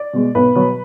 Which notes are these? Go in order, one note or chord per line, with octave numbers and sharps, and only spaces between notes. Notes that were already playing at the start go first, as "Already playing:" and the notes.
Already playing: D5
B2 G#3
B1 B4
B2 F#3 B3